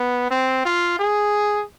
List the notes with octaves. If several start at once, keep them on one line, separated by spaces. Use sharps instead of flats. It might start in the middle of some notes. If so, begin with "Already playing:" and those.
Already playing: B3
C4
F4
G#4